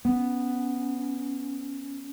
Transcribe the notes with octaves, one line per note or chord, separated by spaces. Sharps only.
B3 C#4